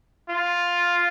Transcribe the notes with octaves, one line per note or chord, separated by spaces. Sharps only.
F4